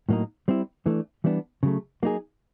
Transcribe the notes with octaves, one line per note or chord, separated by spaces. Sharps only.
A2 F#3 A#3 D#4
G3 C4 E4
E3 A3 D4
E3 G3 B3 D4
C#3 F#3 A3
F#3 A#3 D#4 G#4